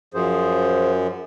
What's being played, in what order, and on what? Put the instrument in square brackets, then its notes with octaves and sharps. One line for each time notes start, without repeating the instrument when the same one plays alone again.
[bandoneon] F#2 [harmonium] F3 G#4 C5